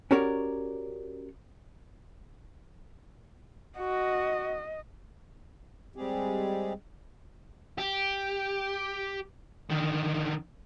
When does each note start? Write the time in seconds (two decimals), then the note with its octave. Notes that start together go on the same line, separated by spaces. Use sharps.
0.11 C#4 F#4 G4 A#4 C#5 D5
3.78 F#4 D#5
5.96 G3 G#3 C4 G4 G#4
7.78 G4
9.70 D3 D#3